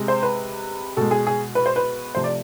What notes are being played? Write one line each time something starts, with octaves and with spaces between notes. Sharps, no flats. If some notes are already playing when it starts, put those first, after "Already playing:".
Already playing: C3 G#3
C5
B4
B2 G#3 A4
G#4
G#4
B4
C5
B4
C3 F3 A3 C5
D5